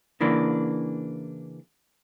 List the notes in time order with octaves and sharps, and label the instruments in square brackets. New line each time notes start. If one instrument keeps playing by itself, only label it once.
[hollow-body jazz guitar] C#3 E3 A#3 D4